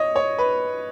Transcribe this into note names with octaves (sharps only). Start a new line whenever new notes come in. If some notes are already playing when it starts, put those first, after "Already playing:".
Already playing: C#5 D#5
C#5
B4